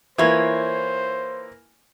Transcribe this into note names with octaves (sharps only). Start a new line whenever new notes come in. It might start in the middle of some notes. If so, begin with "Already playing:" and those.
E3 A#3 E4 F4 C5 C#5